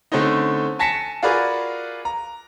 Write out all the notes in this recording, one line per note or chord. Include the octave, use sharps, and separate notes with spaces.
D3 A3 C4 C#4 D#4
G#5 A5 A#6 B6 C#7 E7
F4 F#4 G#4 A#4 B4 D5
A#5